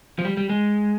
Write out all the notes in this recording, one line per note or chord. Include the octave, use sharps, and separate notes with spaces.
F3
G3
G3
G#3